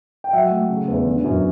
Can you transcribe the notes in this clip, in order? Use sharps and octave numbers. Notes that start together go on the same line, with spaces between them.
G5
F#3 E5 F#5
A3
C#3
E2
D3
F#2